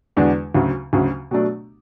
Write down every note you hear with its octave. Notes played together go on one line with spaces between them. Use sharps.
E2 D3 G#3 D4 F#4
D2 C#3 F#3
D2 C#3 F#3
B2 F#3 A3 D4